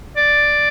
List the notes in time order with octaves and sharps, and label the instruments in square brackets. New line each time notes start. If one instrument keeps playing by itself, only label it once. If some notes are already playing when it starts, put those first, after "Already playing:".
[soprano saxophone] D5